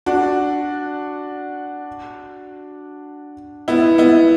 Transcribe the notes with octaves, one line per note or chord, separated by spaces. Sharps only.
D4 F#4
B3 E4
B3 E4